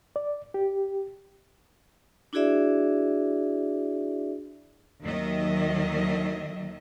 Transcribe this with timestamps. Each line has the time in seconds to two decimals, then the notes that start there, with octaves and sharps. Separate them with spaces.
0.16 D5
0.54 G4
2.33 D4 E4 F#4 G#4 D5 E5
5.03 D#2 D#3 F#3 D#5 E5